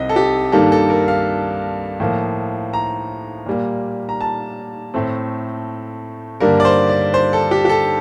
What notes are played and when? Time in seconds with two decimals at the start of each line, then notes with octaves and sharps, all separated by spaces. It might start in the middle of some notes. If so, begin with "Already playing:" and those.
Already playing: C2 C3 C4 D#5
0.09 A4
0.16 G4
0.52 G2 D#3 G3 A#3 A4
0.72 A4
0.90 A#4
1.08 F5
2.00 A2 F3 A#3
2.73 A#5
3.46 A#2 G3 A#3
4.09 A#5
4.21 A5
4.94 A2 A3 C4
6.40 G2 D3 G3 A#3 A#4
6.60 D5
6.65 C5
6.89 D5
7.14 C5
7.33 A4
7.51 G4
7.65 G4
7.69 A4